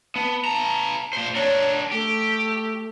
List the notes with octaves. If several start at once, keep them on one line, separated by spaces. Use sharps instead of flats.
B3 A5
B3 A5 A#5
A#2 C5
D4 A#4 C#5
A3 G4